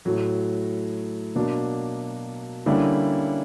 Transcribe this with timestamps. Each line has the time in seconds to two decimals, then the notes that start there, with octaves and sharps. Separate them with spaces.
0.05 A2 F#3 A3
1.35 B2 F#3 A#3 D4
2.66 D3 G3 A#3 C#4 E4